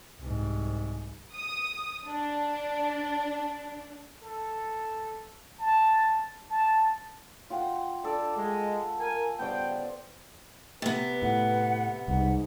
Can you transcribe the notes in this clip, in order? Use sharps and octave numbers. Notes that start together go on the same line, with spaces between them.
C2 G#2
D#6
D4
A4
A5
A5
F4 F#5 G5
D4 A4 D5
G#3
A#4 G#5
G2 C#3 B3 C5 D5 G5
C3 B3 B4
A2 F#5
C2 G#2 F#5